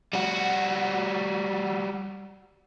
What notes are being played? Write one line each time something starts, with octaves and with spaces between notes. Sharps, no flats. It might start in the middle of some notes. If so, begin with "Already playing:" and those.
G3 F#4